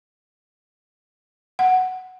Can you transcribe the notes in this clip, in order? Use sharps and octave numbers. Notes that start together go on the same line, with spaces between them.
F#5